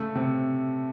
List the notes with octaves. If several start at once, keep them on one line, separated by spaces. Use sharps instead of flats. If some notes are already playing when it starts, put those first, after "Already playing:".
Already playing: C#3 A3
C3